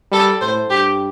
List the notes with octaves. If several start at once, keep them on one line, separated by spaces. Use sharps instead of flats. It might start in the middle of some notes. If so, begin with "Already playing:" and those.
G3 A4
A2 C5
G2 G4